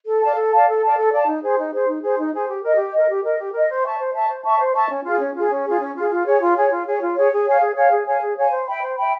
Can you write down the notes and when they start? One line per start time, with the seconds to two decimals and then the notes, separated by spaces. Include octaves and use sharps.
0.06 A4
0.21 D5 F5 A5
0.36 A4
0.51 D5 F5 A5
0.67 A4
0.81 D5 F5 A5
0.97 A4
1.12 D5 F5 A5
1.27 D#4
1.42 G#4 C5
1.57 D#4
1.72 G#4 C5
1.87 D#4
2.02 G#4 C5
2.18 D#4
2.33 G#4 C5
2.48 G4
2.63 A#4 D#5
2.78 G4
2.93 A#4 D#5
3.08 G4
3.23 A#4 D#5
3.38 G4
3.53 A#4 D#5
3.68 C5
3.84 E5 A5 C#6
3.99 C5
4.14 E5 A5 C#6
4.29 C5
4.44 E5 A5 C#6
4.59 C5
4.74 E5 A5 C#6
4.89 C#4
5.04 F4 G#4
5.20 C#4
5.35 F4 G#4
5.50 C#4
5.65 F4 G#4
5.80 C#4
5.95 F4 G#4
6.10 F4
6.25 G#4 C#5
6.40 F4
6.55 G#4 C#5
6.70 F4
6.86 G#4 C#5
7.00 F4
7.15 G#4 C#5
7.31 G#4
7.46 C#5 F5 G#5
7.61 G#4
7.76 C#5 F5 G#5
7.91 G#4
8.06 C#5 F5 G#5
8.22 G#4
8.37 C#5 F5 G#5
8.51 C5
8.66 E5 G5 B5
8.81 C5
8.97 E5 G5 B5